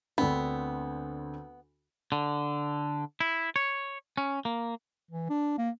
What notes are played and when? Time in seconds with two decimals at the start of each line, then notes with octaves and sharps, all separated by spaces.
0.18 D2 B3 C4 D4
2.12 D3
3.21 E4
3.56 C#5
4.17 C#4
4.45 A#3
5.11 E3
5.30 D4
5.58 A#3